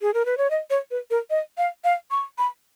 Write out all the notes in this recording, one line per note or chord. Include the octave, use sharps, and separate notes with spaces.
G#4
A#4
B4
C#5
D#5
C#5
B4
A#4
D#5
F5
F5
C#6
B5